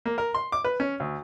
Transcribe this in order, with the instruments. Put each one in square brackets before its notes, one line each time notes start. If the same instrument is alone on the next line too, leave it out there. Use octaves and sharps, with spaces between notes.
[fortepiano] A#3
A#4
C6
D6
B4
C#4
D2